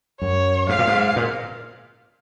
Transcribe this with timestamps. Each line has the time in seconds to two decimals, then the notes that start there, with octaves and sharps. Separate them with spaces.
0.21 F#2 C#5
0.69 G#2 F5
0.79 A#2
0.87 G#2
1.16 A#2